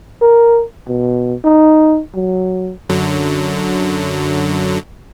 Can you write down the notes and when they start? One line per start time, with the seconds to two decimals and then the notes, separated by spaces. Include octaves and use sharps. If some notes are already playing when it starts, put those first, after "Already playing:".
0.21 A#4
0.88 B2
1.44 D#4
2.15 F#3
2.89 F#2 D3 F#3